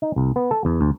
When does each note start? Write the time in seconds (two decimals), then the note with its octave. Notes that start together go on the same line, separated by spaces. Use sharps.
0.02 D#4
0.16 C2
0.36 B3
0.51 A4
0.65 E2
0.81 D2